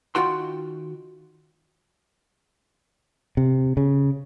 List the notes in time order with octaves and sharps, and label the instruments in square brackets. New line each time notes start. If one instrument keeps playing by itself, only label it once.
[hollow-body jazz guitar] D#3 G#3 F4 F#4 G5 C6
[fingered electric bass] C3
C#3